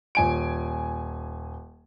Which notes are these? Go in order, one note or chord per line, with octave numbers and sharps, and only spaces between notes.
D#1 G#5 D7